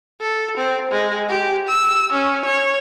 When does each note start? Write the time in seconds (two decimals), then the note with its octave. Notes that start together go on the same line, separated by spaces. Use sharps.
0.21 A4
0.57 C4
0.91 G#3
1.29 G4
1.68 E6
2.12 C#4
2.45 C#5